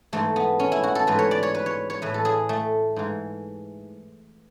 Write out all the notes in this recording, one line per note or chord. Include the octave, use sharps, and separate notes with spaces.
G#2 E3 A3
B3
C#4
E4
F#4
A4
G#2 E3 B4
C#5
D5
C#5
B4
C#5
C#5
A2 E3 B4
A4
G#4
A3
G#2 E3